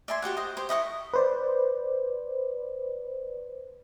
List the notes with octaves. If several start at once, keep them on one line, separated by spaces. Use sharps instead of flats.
D5 E5 G#5 C6
F#4 G4 D5 F#5
C5 D#5
G4 C5
E4 D#5 F#5 C#6
B4 C5 D5